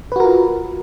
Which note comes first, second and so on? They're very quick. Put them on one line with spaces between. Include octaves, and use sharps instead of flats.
B4 F#4 A#4 F4